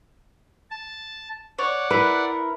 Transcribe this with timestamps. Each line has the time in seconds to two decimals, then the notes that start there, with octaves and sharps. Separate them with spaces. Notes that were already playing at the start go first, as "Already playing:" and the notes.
0.71 A5
1.58 C#5 D5 F#5
1.91 E4 A#4 B4